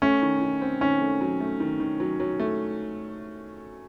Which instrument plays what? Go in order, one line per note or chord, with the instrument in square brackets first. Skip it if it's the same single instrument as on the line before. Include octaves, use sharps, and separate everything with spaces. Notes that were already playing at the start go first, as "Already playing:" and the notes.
[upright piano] A3 [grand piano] C#4
[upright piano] D#3
D#3
C4
[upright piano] D#3 [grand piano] C#4
[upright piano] A3
F#3
A3
D#3
D#3
F#3
F#3
A3